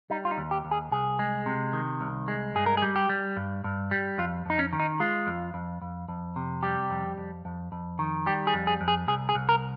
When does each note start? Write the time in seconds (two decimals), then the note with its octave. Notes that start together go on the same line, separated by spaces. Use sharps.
0.10 G3 D#4
0.25 F4
0.31 D#4
0.38 D#2
0.51 G4
0.65 D#2
0.71 G#4
0.91 C2 G#4
1.19 G#3
1.46 C3
1.73 D#3
2.01 C2
2.28 G#3
2.55 G2 G#4
2.66 A#4
2.77 G#4
2.82 G3
2.96 G4
3.09 G3
3.37 G2
3.64 G2
3.91 G3
4.18 F2 F4
4.46 F2 D#4
4.59 C#4
4.73 D#3
4.80 D#4
5.00 G#3 F4
5.27 F2
5.54 F2
5.82 F2
6.08 F2
6.36 C3
6.63 G3 G4
6.90 F2
7.17 F2
7.45 F2
7.72 F2
7.99 D#3
8.26 G3 G4
8.47 G#4
8.54 F2
8.67 G#4
8.81 F2
8.88 G#4
9.08 C2 G#4
9.29 G#4
9.35 C2
9.49 A#4